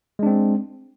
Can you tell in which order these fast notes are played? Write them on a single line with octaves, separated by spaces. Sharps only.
G#3 D4 C4